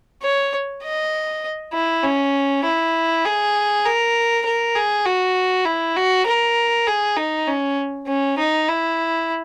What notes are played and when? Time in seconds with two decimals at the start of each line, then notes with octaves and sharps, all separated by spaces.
0.23 C#5
0.84 D#5
1.74 E4
2.03 C#4
2.64 E4
3.25 G#4
3.86 A#4
4.45 A#4
4.76 G#4
5.05 F#4
5.66 E4
5.96 F#4
6.26 A#4
6.87 G#4
7.17 D#4
7.48 C#4
8.07 C#4
8.38 D#4
8.68 E4